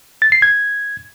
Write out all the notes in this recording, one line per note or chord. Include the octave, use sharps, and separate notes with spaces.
A6
C7
G#6